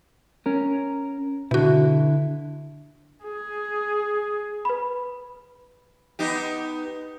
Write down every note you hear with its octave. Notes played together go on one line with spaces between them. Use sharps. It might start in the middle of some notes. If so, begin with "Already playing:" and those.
C#4 A#4
B2 D3 E4 F#4
G#4
B4 B5
B3 D#4 G4